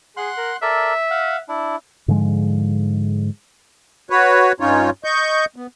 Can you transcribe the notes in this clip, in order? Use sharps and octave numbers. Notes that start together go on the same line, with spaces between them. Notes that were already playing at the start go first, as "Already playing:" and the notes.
G#4 F#5 C6 F#6
A#4
A4 A#4 D5 E5
F5 F#5
D4 E4
G#2 D3 F3 G#3
F#4 B4 C#5
G2 C#4 D#4 F4 C#5
D#5 C#6 G6
B3